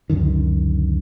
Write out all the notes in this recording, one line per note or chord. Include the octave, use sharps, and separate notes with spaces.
C#2 F#2 D3 D#3